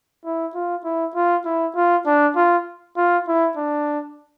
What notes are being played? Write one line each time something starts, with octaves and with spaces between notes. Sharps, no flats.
E4
F4
E4
F4
E4
F4
D4
F4
F4
E4
D4